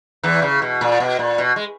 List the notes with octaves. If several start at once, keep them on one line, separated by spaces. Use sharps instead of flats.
E2 E3
C#3
B2
A#2
B2
A#2
B2
G#3